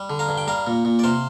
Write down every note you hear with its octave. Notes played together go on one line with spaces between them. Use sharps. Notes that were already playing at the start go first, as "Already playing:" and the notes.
Already playing: G3
D3
F5 A#5
G2
G5
G3 F5 A#5
A#2
A#2
D5
C3 C5 F5